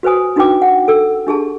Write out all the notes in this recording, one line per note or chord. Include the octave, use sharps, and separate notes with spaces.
F#4 B4 C5 G#5 D#6
D4 D#4 F#4 B4 G5 D6
F#5
A4 E6
D4 G4 G#4 A5